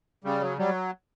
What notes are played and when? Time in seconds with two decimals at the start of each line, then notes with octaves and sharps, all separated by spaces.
0.24 C#3 G3
0.41 F#3
0.58 F#3 G3